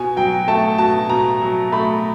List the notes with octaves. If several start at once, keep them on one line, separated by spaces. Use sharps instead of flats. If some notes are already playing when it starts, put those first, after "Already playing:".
Already playing: B2 G#5
F#3 G5
A3 A5
B2 A5
B2 A#5
F#3
A3 B5